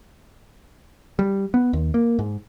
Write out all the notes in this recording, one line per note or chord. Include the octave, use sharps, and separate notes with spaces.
G3
B3
D#2
A#3
G#2